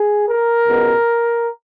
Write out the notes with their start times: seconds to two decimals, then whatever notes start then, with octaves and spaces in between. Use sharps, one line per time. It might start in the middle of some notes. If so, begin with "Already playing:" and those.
Already playing: G#4
0.28 A#4
0.66 C#2 B2 G#3 B3